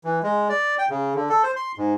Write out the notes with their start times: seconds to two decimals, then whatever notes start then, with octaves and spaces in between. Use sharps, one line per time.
0.04 E3
0.23 G#3
0.49 D5
0.79 G5
0.90 C#3
1.15 D3
1.29 A4
1.43 C5
1.56 C6
1.78 G#2